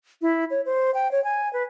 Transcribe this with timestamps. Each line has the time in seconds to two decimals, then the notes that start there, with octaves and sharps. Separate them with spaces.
0.22 E4
0.51 C#5
0.66 C5
0.94 G5
1.11 C#5
1.24 G#5
1.53 B4